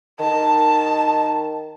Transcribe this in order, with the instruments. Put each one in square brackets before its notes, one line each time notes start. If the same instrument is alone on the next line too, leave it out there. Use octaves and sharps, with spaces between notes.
[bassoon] D#3 [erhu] A5